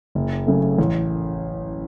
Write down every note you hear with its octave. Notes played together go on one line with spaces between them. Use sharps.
F#1
F#2 C#3 A3
A1